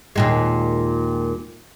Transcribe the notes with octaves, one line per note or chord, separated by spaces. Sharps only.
D#2 A#2 G#3